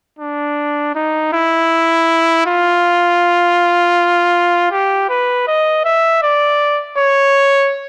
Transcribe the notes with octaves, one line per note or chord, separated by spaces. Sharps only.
D4
D#4
E4
F4
G4
B4
D#5
E5
D5
C#5